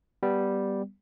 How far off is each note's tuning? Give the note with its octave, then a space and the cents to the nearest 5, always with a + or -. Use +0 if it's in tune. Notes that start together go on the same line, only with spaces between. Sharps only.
G3 +0 B3 +0